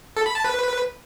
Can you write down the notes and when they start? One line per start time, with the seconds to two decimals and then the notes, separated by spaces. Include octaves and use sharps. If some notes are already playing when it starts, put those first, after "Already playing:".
0.17 A4
0.26 B5
0.35 A5
0.45 B4